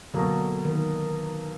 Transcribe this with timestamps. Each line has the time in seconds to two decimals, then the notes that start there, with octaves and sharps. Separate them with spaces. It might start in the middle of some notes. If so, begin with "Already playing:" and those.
0.14 B2 D3 F#3 A#3
0.65 D#3